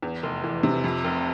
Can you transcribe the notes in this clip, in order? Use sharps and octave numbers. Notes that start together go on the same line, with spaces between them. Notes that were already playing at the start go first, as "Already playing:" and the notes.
E2
F1
E3
C3
F2
F1